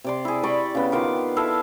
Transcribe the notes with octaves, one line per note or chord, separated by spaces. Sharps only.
C3 D5 C6
E4 G#4
D5 G5 B5 C#6
C#3 B3
D#3 F4 D6
E4 A4 E5 F5